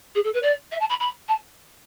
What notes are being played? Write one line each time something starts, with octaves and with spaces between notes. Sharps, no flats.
G#4
A4
B4
D5
E5
A5
B5
B5
A5